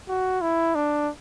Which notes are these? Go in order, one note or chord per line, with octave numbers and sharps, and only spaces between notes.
F#4
E4
D4